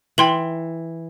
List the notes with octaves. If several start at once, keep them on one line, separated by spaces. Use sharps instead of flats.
E3 G5 C6 F#7